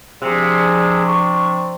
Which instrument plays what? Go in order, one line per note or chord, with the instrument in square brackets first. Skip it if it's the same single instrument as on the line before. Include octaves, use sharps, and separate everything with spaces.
[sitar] C3 [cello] F3 D4 [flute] G#4
[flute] C#6